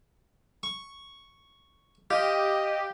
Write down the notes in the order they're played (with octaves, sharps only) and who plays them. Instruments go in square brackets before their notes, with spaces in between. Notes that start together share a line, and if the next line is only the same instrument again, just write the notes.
[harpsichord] C#6
[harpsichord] F4 [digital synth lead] G4 [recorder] D#5